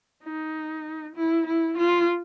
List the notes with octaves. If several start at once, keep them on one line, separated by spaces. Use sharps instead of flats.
D#4
E4
E4
F4